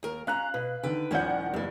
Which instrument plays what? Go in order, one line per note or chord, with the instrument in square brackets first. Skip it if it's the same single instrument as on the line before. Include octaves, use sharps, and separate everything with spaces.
[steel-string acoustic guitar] D#2 A#4
[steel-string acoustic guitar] C#4 A#5 [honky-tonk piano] F5 F#6
[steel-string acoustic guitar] B2 [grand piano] B4
[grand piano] D3 D#3 [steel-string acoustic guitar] B4 G5
[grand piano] D#1 G6 [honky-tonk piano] D#3 D5 F#5 [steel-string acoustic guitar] F3 C#4 E4
[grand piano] F#1 [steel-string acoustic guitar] E2 A#3 [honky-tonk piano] G2